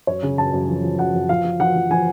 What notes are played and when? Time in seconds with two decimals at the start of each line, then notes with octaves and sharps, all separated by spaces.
0.07 F#2 C#5
0.23 C#3
0.38 F#2 A5
0.53 F#2
0.69 F3
0.84 F3
0.99 F#2 F#5
1.14 F#2
1.29 F3 F5
1.44 F3
1.60 F3 F#5
1.75 F3
1.90 F3 G#5